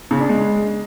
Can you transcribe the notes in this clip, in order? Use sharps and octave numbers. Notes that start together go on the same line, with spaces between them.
C#3
D4
G#3